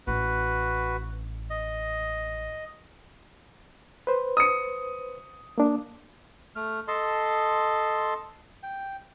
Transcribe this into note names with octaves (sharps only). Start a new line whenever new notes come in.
A1 F#4 B4
D#5
B4 C5
D#6 C#7
A#3 D4
A3 F6
A4 D#5 A5 C6
G5